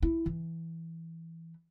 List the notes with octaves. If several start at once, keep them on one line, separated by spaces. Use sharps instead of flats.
E4
E3